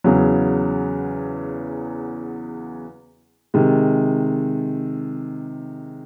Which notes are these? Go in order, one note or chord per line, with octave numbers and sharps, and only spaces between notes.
E2 C#3 F#3
C3 D#3 G#3